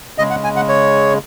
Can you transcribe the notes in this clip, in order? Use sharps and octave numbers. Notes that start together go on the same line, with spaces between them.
C#3 G#3 D#5
F#5
G#5
F#5
C#5